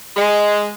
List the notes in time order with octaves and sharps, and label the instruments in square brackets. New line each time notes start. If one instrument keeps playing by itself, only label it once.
[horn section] G#3